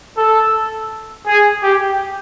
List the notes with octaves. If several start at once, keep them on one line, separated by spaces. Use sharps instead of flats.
A4
G#4
G4